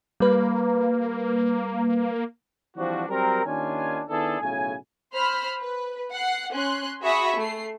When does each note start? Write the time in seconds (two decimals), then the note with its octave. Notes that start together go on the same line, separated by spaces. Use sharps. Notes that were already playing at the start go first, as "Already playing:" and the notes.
0.20 G3 A#3 B4
2.76 E3 F3 G3 C4 D4 F#4
3.09 F#3 G3 C4 A#4
3.45 D#2 D#3 C#4 D4 F4 G#5
4.09 D#3 B3 D4 E4 G#4 A4
4.41 B1 A2 C#3 C#4 G#5
5.14 C5 B5 F6
5.61 B4
6.12 F#5 C7
6.54 C#4 C6 F#6
7.02 F#4 G#4 E5 B5 C#6 D#6
7.36 A3 C7